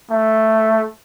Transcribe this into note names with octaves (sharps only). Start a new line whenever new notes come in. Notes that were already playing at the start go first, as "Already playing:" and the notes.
A3